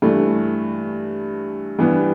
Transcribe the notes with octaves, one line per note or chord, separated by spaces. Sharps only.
G2 E3 A3
G2 E3 G3 B3